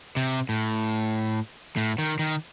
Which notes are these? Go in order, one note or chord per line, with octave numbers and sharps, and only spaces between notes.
C3
A2
A2
D#3
D#3